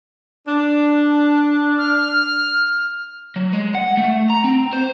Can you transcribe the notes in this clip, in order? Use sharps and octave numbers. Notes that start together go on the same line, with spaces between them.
D4
F6
F#3
G#3
F#5
A3
A#5
C4
C5